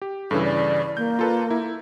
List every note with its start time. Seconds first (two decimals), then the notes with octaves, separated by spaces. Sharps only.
0.02 G4
0.31 G2 C#3 E3 A4
0.44 D5
0.97 A#3 G6
1.19 F4 A4 B4
1.50 E4